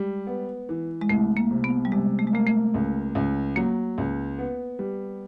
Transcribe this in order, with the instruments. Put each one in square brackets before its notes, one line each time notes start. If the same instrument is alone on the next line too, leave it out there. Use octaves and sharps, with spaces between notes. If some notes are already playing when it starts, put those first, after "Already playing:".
Already playing: [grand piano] G3 [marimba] G#3
[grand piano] B3
E3
[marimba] G#3
[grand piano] C2 [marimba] A3
[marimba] A#3
[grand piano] C3
[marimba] B3
G3
[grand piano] C3 [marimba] G#3
[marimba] A3
G#3
[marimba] A3 [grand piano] A#3
[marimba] A3
[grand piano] C#2
C#2
[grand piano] F#3 [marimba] A#3
[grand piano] C#2
B3
G3